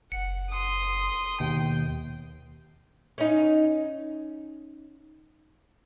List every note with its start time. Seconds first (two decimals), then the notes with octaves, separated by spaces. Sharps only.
0.12 F#1 F#5 C#7
0.50 C6 D#6
1.40 D#2 B2 G5
3.18 C#4 D#4